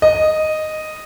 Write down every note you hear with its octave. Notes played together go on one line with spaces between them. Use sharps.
D#5